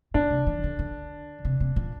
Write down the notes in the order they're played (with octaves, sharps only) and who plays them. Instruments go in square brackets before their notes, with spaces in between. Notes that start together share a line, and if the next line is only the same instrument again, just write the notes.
[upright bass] A#2 [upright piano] D4
[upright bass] C3
D#3
D3
D3
C3
C3
A#2